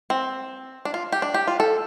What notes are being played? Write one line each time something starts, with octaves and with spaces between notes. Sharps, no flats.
C4
D4
F4
G4
D4
G4
F4
A4